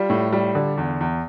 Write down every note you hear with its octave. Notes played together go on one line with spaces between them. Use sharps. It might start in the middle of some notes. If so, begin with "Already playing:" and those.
Already playing: G3 F4
A2
G3
D3
E2
E2